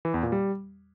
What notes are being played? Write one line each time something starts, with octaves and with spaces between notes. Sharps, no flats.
E3
E2
A#2
G3